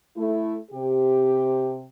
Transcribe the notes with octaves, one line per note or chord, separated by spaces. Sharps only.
A3 E4
C3 G4